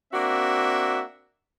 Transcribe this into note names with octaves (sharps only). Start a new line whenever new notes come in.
A#3 C4 D4 F#4 E5